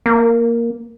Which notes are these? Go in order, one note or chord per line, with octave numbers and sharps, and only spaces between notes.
A#3